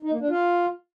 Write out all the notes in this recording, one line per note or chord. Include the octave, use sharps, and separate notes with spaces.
D#4
A#3
D4
F4